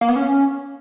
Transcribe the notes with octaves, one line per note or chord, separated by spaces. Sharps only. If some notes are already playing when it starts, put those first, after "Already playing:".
A#3
B3
C#4